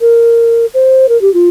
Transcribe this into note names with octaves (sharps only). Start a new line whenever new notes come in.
A#4
C5
A#4
G4
F4